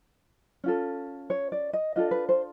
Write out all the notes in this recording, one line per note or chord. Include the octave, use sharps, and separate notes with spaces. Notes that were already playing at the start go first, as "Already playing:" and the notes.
C#4 F4 A4
C#5
D5
D#5
D4 F4 A4 D#5
B4
C5